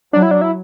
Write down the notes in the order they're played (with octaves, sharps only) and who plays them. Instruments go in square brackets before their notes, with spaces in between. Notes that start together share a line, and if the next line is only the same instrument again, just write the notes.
[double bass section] F#3 [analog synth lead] D4
[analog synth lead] E4
D4
E4